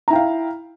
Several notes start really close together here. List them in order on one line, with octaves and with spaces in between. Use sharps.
A#5 E4 G5 F5